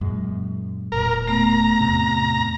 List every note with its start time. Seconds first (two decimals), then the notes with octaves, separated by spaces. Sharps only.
0.01 F#2 A#2 G#3
0.92 E1 A#2 A#4
1.27 A3 B3 A#5
1.81 E2 A2 C3